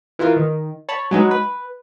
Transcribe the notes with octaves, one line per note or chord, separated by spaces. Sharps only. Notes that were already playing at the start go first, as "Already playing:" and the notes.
E3 E4 F4 A#4
D#3
C#5 A5 B5
F#3 G#3 D#4 B4
B4